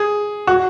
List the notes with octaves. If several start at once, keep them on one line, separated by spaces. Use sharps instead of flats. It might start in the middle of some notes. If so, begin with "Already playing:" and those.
Already playing: G#4
F#4